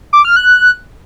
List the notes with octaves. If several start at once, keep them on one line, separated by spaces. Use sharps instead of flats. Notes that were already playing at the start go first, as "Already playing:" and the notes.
D6
F6
F#6